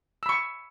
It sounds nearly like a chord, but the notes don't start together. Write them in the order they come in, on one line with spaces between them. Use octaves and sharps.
E6 B5 C#6